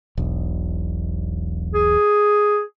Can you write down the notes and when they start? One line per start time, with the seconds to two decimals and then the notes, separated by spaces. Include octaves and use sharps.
0.18 E1 B1
1.74 G#4